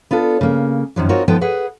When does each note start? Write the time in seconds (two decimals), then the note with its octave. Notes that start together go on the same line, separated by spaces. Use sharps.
0.11 B3 D4 F4 A4
0.41 C#3 A#3
0.96 F#2 D#3 F3 F#3
1.09 C4 D#4 F4 F#4 A#4 C#5
1.28 D#2 F3 B3 D#4 A4 G5
1.41 G#4 B4 F#5